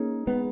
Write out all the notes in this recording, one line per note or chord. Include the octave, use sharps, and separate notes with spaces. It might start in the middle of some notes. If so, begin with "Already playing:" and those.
Already playing: A#3 C#4 D#4 G#4
G#3 B3 B4